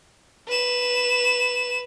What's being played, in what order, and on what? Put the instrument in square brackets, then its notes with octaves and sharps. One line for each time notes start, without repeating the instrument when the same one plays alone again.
[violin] B4 E7